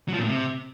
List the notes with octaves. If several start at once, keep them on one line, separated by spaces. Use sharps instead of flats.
F#3
F3
A#2
A2
C3